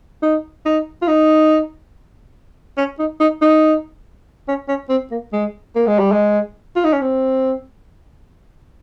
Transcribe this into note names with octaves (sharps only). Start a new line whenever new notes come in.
D#4
D#4
F4
D#4
C#4
D#4
D#4
D#4
C#4
C#4
C4
A#3
G#3
A#3
G#3
G3
G#3
F4
D#4
C#4
C4